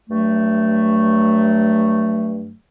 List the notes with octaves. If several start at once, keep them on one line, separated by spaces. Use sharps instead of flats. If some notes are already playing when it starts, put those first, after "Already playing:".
G2 F#3 A3